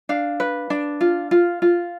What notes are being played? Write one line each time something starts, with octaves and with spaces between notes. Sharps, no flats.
D4 F5
B4
D4
F4
F4
F4